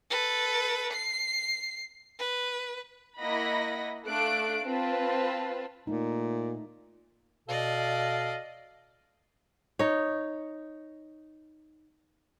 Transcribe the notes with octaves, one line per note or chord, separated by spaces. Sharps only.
A4 B4
C7
B4
A#3 E4 D#5 F#5 B5 A#6
A3 D4 F5 F#6 D7
C4 F4 B4 A5
A#2 A3 D#4
B2 A4 D5 D#5 F5
D#4 C#5